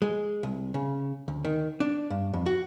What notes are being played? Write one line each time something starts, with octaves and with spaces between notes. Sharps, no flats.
G#3
C2
C#3
D2
D#3
D4
G2
F2
F#4